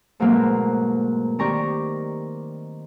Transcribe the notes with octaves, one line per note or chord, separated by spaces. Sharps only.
G#2 B2 F#3 A3 A#3 C4
D#3 C4 G4 D5 A#5 C#6